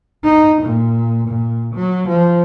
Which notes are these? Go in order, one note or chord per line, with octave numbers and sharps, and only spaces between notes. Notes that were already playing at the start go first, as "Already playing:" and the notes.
D#4
A#2
A#2
F#3
F3